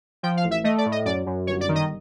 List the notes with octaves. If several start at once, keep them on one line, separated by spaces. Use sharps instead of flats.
F3 G5
F5
A1
E5
A3 D#5
D5
A2
D#5
F#2 D5
F#2
G1 C#5
D5
D#3
D#5